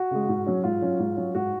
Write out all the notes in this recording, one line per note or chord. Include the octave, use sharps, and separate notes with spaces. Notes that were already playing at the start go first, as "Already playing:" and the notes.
Already playing: F#4
C#3 G#3
G#2
F#3 C#4
G#2 F4
F#3 C#4
G#2
F#3 C#4
G#2 F#4